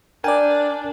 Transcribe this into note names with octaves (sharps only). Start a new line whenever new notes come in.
D4 A#4 D5 G5 G#5